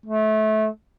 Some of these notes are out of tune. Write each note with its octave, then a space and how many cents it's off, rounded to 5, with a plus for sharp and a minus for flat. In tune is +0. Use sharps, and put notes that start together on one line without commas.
A3 -25